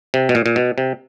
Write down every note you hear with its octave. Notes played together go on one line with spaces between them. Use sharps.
C3
B2
A#2
A#2
B2
C3